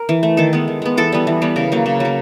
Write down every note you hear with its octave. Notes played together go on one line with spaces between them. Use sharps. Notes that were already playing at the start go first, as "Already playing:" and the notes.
Already playing: A#4
E3
A3
D#3 A4
G#3 B3
D#3
G#3 B3
E3 A4
G3 B3
E3
G3 B3
C#3 A#4
F#3 A#3
C#3
F#3 A#3